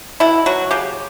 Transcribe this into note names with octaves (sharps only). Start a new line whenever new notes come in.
B2 E4
F#3 F#4
C#3 G4